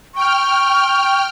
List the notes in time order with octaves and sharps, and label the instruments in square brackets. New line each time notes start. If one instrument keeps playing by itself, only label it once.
[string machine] G5 F6 [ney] C#6